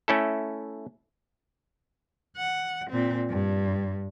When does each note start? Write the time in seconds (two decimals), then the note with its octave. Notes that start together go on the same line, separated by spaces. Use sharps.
0.08 A3 C#4 E4 A4
2.36 F#5
2.90 A#2 C4
3.29 G2